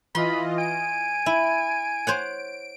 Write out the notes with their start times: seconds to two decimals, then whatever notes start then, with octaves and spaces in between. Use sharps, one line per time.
0.15 E3 F4 D#5 B5 C6
0.58 G#5 D7
1.26 E4
2.07 C5 C#5 F#5